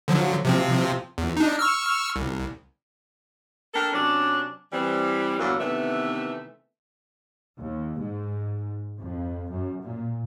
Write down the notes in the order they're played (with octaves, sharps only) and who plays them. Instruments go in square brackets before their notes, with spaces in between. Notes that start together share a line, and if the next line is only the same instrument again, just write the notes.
[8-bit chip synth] D3 F3 F#3
C3 F3 C4
E2
D4 D#4
C#6 E6 F6
C2
[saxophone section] D4 G4 A4 A#4
C3 F#3 C#4 D4
E3 G3 C4
E2 G2 A#2 D3 F#3 A#3
C3 D#3 E3 A3 B3 E5
[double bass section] D#2
G#2
F2
F#2
A#2